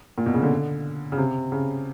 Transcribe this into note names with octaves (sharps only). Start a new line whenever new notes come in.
A#2
B2
C#3
D3
C#3
C3
C#3